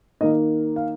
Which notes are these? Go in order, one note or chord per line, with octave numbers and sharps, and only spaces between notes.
D#3 A#3 D#4 D#5
F5